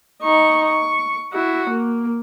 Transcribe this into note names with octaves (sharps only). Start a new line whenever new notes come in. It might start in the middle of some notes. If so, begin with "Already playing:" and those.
D#4 C#6
C#6
E4 F#4
A#3